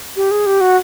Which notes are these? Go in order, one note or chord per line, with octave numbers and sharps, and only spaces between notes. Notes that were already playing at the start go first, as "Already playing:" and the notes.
G4
G#4
G4
F#4